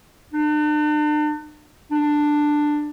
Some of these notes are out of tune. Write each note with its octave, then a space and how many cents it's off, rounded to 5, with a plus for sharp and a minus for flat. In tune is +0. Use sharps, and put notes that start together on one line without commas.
D4 +40
D4 +10